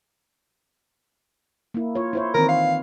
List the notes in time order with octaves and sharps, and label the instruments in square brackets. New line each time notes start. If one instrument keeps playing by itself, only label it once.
[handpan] A#3 E4
F4 C#5
E4 C5 C#5
[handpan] D#3 E3 C4 [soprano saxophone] A#4
[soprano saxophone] F5